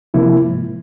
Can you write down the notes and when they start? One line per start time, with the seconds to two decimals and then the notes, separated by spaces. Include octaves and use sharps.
0.14 C3 F3 A#3 E4
0.41 G#2